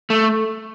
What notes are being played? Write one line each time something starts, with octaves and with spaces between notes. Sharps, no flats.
A3